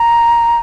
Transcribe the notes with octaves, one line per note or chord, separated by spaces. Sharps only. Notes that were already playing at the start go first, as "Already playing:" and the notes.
Already playing: A#5